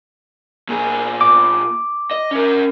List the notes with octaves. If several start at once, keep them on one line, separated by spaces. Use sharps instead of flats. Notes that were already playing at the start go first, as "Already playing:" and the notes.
A#2 G#4
D6
D#5
C#4 A#4